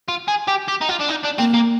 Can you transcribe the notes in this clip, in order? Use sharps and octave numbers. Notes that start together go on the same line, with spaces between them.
F4
G#4
G4
G4
D#4
F4
D4
D#4
D4
A#3 C4
A#3